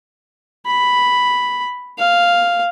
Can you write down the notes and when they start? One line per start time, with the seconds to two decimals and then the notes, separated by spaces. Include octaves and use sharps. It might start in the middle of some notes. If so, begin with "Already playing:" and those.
0.67 B5
1.99 F5